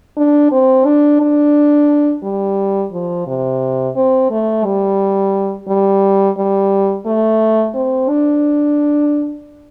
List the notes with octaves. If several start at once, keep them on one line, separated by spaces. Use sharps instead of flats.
D4
C4
D4
D4
G3
F3
C3
C4
A3
G3
G3
G3
A3
C4
D4